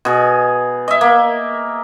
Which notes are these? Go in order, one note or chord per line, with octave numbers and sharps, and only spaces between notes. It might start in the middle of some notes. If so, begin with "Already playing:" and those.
B2 G#4
D#5 E5
A#3